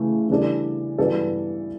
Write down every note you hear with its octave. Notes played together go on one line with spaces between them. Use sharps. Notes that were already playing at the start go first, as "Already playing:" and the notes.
Already playing: C#3 E3 A3
E3 G3 D4 A4
G2 E3 B3 F#4 A4